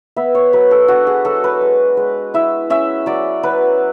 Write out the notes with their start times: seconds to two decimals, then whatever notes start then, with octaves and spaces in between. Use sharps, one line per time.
0.16 B3 E5
0.35 C#5
0.53 F#3 B4
0.71 A4
0.88 D4 F#4
1.07 G#4
1.25 F#3 A4
1.44 B4
1.61 G#3
1.97 G#3
2.34 E4 E5
2.70 C#4 E5
3.06 F#3 D5
3.43 F#3 B4